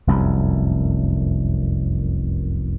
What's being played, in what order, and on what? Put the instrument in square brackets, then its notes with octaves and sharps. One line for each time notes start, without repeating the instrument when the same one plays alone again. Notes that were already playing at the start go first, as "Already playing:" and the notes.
[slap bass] F1 C2 F#2